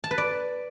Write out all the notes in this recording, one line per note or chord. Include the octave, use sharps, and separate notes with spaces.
A5
B4
D5